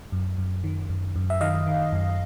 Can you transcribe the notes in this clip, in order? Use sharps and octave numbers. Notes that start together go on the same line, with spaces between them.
F#2
F#2
D#3
F#2
F#2
E5
D#3 D#5 F5
D#3
F#2